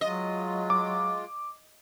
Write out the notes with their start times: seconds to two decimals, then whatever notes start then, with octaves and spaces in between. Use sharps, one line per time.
0.01 F#3 G#3 F4 D#5
0.70 D6